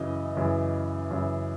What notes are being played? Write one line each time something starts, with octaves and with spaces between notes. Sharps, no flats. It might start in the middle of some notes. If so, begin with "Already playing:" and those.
Already playing: F#2 C#3 E3 D#5
F#2 C#3 E3
F#2 C#3 E3